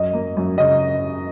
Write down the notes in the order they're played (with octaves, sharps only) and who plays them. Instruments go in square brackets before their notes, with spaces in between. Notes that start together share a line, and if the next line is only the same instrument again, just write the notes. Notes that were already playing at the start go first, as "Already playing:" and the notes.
Already playing: [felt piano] F#2 [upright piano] D#5
[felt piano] A#3
F#2
[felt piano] C#3 [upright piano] D#5